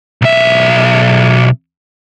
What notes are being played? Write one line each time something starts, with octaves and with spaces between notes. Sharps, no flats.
B1 E5